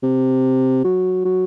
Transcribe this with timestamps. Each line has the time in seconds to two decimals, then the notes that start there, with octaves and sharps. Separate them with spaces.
0.03 C3
0.84 F#3
1.25 F#3